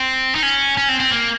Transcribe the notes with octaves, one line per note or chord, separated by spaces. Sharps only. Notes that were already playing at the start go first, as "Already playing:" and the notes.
Already playing: C4
D#4
C#4
C#4
C4
C4
A#3